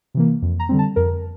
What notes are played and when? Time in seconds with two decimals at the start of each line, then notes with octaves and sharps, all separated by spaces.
0.14 C3 E3 A#3
0.42 F2
0.60 A#5
0.69 D3 G3 C4
0.79 A5
0.96 F2 A#4